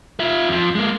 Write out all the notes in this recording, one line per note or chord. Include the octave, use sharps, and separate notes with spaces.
F4 E5
F2 F3
G#3 A#3